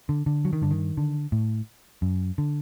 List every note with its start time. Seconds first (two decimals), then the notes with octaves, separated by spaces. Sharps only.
0.09 D3
0.26 D3
0.45 F#3
0.53 D#3
0.62 G2 D3
0.71 D#3
0.97 D3
1.32 A2
2.02 F#2
2.38 D3